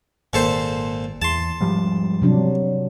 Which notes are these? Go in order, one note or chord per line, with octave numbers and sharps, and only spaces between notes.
G#1 A#2 A4 C5
E2 A5 C6
G#2 F3 G3
C3 F#3 D4